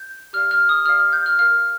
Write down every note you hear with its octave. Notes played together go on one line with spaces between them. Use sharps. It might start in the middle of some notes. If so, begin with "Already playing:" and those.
Already playing: G6
G4 D5 F5 F6
F6
D#6
G4 D5 F5 F6
F6
G6
F6
A#4 F5 F6